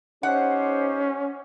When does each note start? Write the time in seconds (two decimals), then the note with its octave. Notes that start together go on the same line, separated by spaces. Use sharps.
0.23 C#4 D#4 G4 C5 F#5